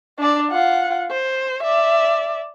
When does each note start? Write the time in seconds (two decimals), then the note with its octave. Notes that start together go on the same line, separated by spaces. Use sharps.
0.18 D4 D5
0.52 F4 F#5
1.11 C5
1.63 D5 E5